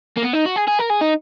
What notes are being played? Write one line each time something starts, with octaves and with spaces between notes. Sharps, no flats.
A#3
B3
D#4
F#4
G#4
G#4
A#4
G#4
D#4